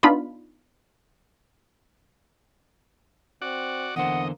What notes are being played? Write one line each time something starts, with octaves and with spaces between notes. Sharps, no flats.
B3 D4 D#4 F4 B5
C4 F#4 D5
E2 D3 A#3 C5 D#5 F#5